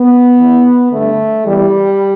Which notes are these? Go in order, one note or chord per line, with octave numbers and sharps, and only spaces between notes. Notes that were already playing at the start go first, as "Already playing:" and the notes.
Already playing: B3
E2 E3
G2 D3 A3
E2 E3 G3